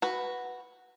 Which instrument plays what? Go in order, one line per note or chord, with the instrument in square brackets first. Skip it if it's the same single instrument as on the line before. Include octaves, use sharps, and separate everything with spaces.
[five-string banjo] F#4 B4